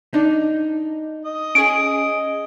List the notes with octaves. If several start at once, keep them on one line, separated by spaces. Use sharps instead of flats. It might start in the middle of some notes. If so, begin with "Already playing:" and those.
D4 D#4
D#5
C#4 G#4 D7